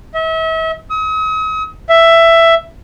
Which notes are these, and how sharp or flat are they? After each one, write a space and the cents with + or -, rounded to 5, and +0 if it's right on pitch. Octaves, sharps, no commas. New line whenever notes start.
E5 -40
D#6 +40
E5 +10